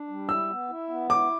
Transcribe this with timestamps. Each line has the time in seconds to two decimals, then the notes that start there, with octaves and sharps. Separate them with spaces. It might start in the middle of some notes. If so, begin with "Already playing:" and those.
Already playing: D4
0.08 G3
0.29 E4 E6
0.49 B3
0.70 E4
0.89 B3
1.10 E4 D6